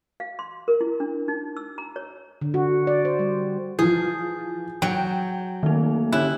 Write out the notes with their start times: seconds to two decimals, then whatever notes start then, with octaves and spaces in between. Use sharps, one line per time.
0.20 F5
0.39 C6
0.68 A#4
0.81 E4
1.00 D4
1.28 D#4
1.57 E6
1.78 A#5
1.96 C#5
2.41 D3
2.54 F#4
2.87 D5
3.05 C5
3.19 G3
3.79 E3 F3 G#4 G6
4.82 F#3 G5
5.63 D#3 A3 A#3 D#4
6.12 D3 C#4 E4 G4 F#6